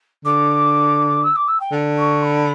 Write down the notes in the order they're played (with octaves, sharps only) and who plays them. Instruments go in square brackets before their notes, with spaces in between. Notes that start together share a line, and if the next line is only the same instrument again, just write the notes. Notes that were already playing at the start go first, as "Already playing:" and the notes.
[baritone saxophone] D3 [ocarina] D6
[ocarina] E6
D6
E6
G5
[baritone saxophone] D3
[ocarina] C#6
B5